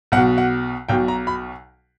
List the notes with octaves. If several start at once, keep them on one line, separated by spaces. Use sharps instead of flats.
B1 F#5
B2
F#5
B1 B2 G5
A#5
B5